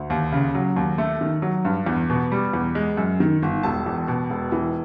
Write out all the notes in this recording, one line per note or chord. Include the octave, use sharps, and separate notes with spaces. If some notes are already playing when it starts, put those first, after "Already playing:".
Already playing: D2
D#2
C#3
F#3
D#2
A3
D#3
F#3
G2
E2
B2
G3
E2
G#3
F#2
D#3
G1
E1 A5
E2
B2
E1
E3